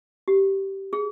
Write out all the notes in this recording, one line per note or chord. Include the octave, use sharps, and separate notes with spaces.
G4
G#4